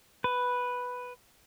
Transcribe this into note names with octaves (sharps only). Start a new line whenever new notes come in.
B4